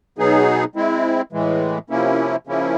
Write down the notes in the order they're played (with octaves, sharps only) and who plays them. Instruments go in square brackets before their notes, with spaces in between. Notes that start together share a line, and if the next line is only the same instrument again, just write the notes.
[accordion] B2 F#3 B3 D#4 G#4
G#3 C4 E4
A2 E3 G#3
C3 F3 A#3 C#4 E4
C#3 F3 A#3 C#4 E4